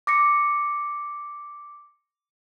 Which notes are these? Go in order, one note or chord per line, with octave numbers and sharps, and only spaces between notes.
D6 A#6 C#7